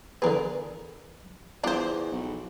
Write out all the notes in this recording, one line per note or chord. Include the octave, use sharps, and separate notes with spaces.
D3 E3 B3 G#4 A#4
E2 D4 F4 C5 F#5 D6
B1